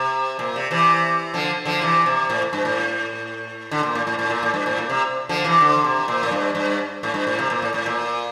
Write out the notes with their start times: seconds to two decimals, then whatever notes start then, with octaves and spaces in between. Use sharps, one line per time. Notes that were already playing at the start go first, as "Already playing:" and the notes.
Already playing: C3
0.39 A#2
0.56 C3
0.71 C3 E3
1.34 D3 F3
1.65 D3 F3
1.81 C3 E3
2.06 C3
2.30 A2
2.53 G2
2.65 A2
3.71 D3
3.83 A#2
3.95 A2
4.07 A2
4.19 A2
4.30 A#2
4.43 A2
4.54 G2
4.66 A2
4.78 A#2
4.90 C3
5.29 D3 F3
5.44 C3 E3
5.61 D3
5.84 C3
6.08 A#2
6.23 A2
6.31 G2
6.55 G2
7.03 A2
7.14 G2
7.27 A2
7.39 C3
7.50 A#2
7.62 A2
7.74 A2
7.86 A#2